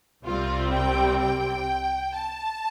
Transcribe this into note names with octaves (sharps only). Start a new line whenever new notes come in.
C2 C3 G3 C4 F4
G5
G5
A5